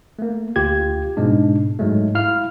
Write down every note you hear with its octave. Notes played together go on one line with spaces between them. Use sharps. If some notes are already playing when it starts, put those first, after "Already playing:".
A3 A#3
D2 F4 G4 G#6
G#2 B2 G#3 D4
G#2 F#3 G#3 A3
E4 F5 F6